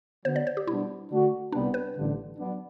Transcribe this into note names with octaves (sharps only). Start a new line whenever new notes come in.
D3 F#3 B3 C5
D5
C5
G4
B2 G3 B3 D4 E4
D3 A3 D4 F#4
C2 C3 G3 B3 D4
B4
A1 G2 D3
F#3 B3 D4